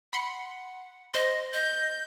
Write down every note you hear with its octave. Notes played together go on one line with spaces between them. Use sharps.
F#5 B5 C6 C#7
C5 D#5 C6
D#5 G6